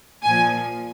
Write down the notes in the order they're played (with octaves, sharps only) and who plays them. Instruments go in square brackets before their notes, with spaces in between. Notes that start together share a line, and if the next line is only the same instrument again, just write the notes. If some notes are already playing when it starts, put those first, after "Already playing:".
[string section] A#2 F3 G#5